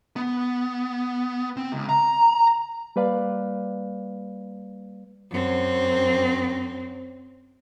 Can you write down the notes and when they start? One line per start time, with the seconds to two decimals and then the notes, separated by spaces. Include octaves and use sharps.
0.16 B3
1.57 C4
1.72 C#2
1.89 A#5
2.96 G3 A#3 B4 D5 F5
5.30 F#2 C4